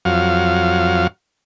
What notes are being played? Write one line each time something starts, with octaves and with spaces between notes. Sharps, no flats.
F2 F#3 F5